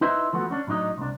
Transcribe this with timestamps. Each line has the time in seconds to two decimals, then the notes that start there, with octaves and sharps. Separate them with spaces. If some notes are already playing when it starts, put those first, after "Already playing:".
0.01 D#4 E4 B4 C5 D#5 E5
0.33 F3 A3 B3 F#4
0.51 C#4 D4
0.67 A2 F#3 D4 D#4 D#5
0.98 C2 D4